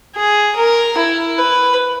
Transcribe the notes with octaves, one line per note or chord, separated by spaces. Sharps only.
G#4
A#4
E4
B4